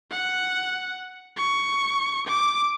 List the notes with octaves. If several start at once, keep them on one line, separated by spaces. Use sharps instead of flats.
F#5
C#6
D6